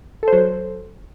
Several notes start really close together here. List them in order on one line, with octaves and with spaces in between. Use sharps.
A4 C5 F#3